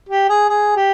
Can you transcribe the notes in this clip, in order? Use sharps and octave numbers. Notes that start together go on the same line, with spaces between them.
G4
G#4
G#4
G4